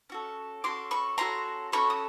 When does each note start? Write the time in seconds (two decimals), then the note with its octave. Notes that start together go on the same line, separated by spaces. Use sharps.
0.10 C#4 F#4 A4
0.64 C#4 F#4 A4 C6 D6
0.91 B5 C#6
1.18 C#4 F#4 A4 A#5 C6
1.72 C#4 F#4 A4 B5 C#6
1.90 D#6